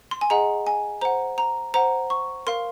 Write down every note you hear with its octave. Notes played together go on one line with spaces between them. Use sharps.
C6
G#5
G#4 D#5 F#5 A#5
G#5
C5 F#5 A#5
A#5
C5 F#5 A#5
C#6
A#4 F5 C6